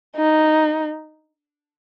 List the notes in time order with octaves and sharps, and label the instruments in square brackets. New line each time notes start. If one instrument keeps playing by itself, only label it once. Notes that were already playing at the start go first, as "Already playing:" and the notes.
[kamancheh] D#4